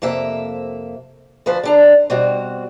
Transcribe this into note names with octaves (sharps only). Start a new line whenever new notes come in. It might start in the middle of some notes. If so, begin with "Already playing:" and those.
F2 C3 A#3 E5
D2 F3 B4 C5
D3 D4 A#5
B2 G3 C4 F#4